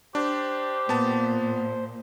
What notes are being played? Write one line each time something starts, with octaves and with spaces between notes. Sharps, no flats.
D4 G4 C5
A#2 B3 A5